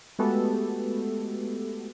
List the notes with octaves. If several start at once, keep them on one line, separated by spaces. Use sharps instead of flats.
G#3 A3 B3 F#4 G4 A4